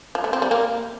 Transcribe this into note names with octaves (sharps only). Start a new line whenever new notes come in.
F3
A3
C4
G3
A#3